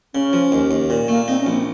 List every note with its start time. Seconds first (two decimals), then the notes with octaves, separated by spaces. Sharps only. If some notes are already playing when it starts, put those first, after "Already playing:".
0.14 C#3 C#4
0.33 F3
0.52 D#2
0.71 D#2
0.90 A#2
1.08 A3 A#3
1.28 C4 D#4
1.40 C#4
1.46 A#1
1.53 C4